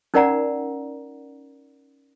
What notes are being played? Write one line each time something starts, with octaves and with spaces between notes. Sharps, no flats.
C#4 D#4 A#4 D5 F#5 A#5